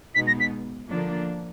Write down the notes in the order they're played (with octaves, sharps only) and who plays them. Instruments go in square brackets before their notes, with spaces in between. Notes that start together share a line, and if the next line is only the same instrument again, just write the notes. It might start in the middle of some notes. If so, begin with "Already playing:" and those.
[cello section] B2 G#3 B3 D#4 [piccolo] B6
[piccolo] A#6
B6
[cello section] D3 F3 A#3 D4